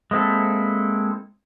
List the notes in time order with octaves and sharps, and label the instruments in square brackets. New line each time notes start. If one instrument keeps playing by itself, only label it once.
[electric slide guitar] G#3 A#3 C4 E4 A4